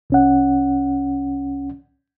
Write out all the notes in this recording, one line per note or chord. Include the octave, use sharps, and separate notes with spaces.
C2 C#4 F#5